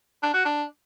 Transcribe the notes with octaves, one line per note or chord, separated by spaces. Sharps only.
D4
F#4
D4